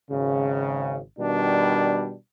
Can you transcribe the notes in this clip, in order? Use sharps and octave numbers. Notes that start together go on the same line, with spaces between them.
G#1 C#3
B2 D#3 G3 D4